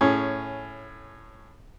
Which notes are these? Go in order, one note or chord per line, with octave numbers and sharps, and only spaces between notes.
A2 C#4 G#4